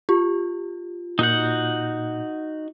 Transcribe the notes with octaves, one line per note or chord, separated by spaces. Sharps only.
F4 G4
A#2 D#4 F#4 F#5 G6